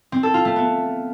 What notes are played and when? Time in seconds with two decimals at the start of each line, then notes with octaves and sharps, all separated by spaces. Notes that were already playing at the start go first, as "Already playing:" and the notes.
0.12 C4
0.23 A4
0.34 F4
0.45 A3
0.56 B3